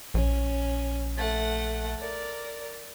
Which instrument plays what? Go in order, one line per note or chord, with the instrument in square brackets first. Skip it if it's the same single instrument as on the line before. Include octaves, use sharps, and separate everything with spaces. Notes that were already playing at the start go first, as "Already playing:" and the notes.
[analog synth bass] A#1 [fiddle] C#4
[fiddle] A3 F#5
A#4 D5